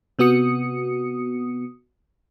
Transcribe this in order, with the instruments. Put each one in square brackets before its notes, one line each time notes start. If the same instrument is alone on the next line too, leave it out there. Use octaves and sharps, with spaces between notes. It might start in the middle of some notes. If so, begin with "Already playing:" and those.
[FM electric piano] C3 B3 F#4 D#6 C#7